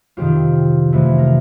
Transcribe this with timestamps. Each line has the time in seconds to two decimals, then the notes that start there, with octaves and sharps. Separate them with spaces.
0.17 F2 C3 D#3 F4 G4
0.92 F2 C3 E3 A3
1.18 A#4